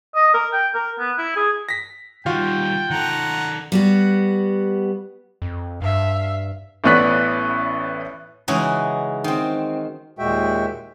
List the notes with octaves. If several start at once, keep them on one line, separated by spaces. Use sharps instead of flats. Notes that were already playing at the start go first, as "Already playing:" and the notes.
D#5
A#4
G5
A#4
B3
E4
G#4
A#6 B6
D#3 G3 F4 F#4 F5 G5
D#3 A4 F#5 A#5
G3 B3 F#4
F2
G2 E5 F5
A1 A2 B3 D5 F#6 B6
C#3 E3 G#3 D#4 F#4
D#3 C4
D#2 A#2 G#3 F#4 E5 G5